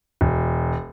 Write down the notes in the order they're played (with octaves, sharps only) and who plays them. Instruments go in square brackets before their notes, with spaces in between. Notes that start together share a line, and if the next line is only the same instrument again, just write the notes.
[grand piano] E1